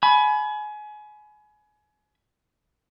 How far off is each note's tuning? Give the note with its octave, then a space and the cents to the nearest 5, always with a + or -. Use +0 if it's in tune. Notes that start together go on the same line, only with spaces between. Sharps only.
G#5 +30 B5 +0